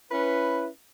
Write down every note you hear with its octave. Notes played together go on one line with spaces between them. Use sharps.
C#4 E4 B4